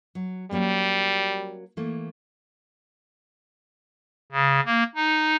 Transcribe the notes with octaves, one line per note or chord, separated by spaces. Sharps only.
F#3
F#3 G3 A#3 C#4
E3 A3 A#3
C#3
A#3
D#4